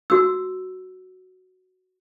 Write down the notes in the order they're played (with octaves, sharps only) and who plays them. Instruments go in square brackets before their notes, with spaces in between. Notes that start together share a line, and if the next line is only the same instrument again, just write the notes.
[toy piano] F#4 E6